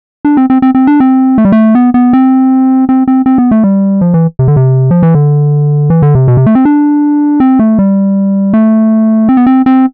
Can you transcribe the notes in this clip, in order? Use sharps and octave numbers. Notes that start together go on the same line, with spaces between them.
D4
C4
C4
C4
C4
D4
C4
A3
G3
A3
B3
B3
C4
C4
C4
C4
B3
A3
G3
F3
E3
C3
D3
C3
F3
E3
D3
E3
D3
C3
B2
C3
A3
C4
D4
C4
A3
G3
A3
C4
B3
C4
C4